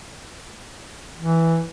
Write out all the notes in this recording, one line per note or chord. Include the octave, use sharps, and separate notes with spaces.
E3